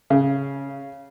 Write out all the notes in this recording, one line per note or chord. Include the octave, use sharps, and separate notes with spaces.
C#3